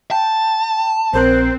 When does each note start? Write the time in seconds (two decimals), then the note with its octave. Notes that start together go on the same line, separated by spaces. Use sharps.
0.11 G5 A5
1.14 A#1 C4 A#4 C5 F#6